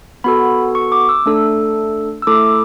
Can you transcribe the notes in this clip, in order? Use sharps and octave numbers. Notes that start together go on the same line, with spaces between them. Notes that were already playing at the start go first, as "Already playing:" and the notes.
B3 F#4 A4 B5
C#6
D6
E6
A3 D4 A4
E6
A3 E4 A4 D6